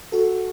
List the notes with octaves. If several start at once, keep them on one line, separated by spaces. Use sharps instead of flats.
F#4 A4